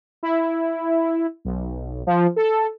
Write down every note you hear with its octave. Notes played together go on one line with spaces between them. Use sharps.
E4
B1
F3
A4